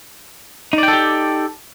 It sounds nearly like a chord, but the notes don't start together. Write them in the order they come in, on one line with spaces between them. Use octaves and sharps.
D#4 D5 G5 A4 G4